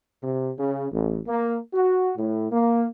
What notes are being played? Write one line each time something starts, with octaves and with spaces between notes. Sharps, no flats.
C3
C#3
A1
A#3
F#4
A2
A#3